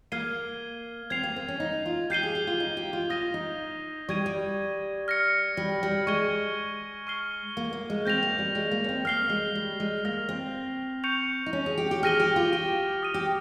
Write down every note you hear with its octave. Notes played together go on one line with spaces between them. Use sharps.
A#3 F6 G#6 C7 D#7 G7
C4 G#6 C7 F7
A#3
C4
C#4
D#4
F4
G4 G6 C7 D#7 G7
G#4
G4
F4
D#4
G4
F4
F4 D#6 A#6 D#7 G7
D#4
G3 C#6 G#6 D#7
G3
F6 A#6 C#7
G3
G3
G#3 C#6 G#6 D#7 G7
C#6 F6 C7 G7
A#3
A#3
G#3
C4 G6 A#6 F7
A#3
G3
G#3
A#3
C#4
C4
A#3 F6 C7 G7
G#3
G3
G#3
A#3 F6 A#6 F7
C4
C#6 G6 C#7 F7
D#4
C#4
G#4
G4
G4
G#4 F6 A#6 D#7 G7
G4
F4
G4
D#6 A#6 D#7
G4